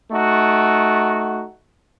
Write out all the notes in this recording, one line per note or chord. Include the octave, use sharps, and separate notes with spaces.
A3 D#4 F#4